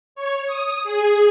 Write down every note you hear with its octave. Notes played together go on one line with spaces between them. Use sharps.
C#5
D#6
G#4